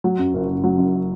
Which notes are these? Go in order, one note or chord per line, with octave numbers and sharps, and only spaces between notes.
F#3
F#2
F#1
F#1
F#3
F#2